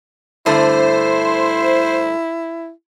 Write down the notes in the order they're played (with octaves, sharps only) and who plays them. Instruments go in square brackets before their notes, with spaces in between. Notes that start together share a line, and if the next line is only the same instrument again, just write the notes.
[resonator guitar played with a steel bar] G2 D3 A3 [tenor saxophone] E4 [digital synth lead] C5